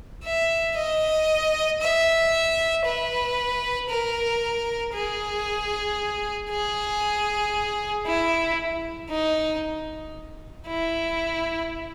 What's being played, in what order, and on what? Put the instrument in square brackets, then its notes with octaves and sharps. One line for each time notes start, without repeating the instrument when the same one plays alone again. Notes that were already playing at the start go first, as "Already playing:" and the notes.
[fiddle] E5
D#5
E5
B4
A#4
G#4
G#4
E4
D#4
E4